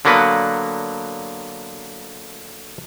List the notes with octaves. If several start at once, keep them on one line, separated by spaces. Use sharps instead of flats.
D3 F#3 A#3 B3 B4